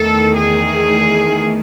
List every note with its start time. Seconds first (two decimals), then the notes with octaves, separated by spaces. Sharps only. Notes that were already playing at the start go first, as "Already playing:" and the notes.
Already playing: E2 D#3 A3 A4
0.36 G#4